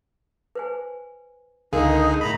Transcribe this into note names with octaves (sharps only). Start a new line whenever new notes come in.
B4 C5 G#5
C#2 D3 D#4 G#4 A#4 F5
A2 A#5 B5